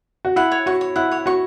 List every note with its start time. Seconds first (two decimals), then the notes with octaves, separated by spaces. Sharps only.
0.25 F#4
0.36 E4 F#5
0.52 C#5
0.66 F#4 C#6
0.81 C#5
0.96 E4 F#5
1.11 C#5
1.26 F#4 C#6